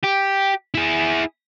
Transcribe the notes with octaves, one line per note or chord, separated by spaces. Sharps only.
G4
E4 G#4